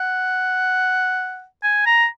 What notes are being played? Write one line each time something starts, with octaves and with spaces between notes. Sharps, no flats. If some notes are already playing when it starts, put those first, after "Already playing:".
Already playing: F#5
G#5
A#5